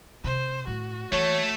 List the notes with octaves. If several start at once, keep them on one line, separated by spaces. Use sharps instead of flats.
C3 C5
A2 F#4
E3 A3 A4 C#5